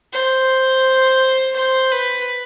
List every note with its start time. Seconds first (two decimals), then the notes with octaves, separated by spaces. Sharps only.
0.13 C5
1.56 C5
1.91 B4